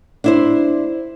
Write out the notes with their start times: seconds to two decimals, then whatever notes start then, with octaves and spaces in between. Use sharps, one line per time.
0.24 D4 E4 C5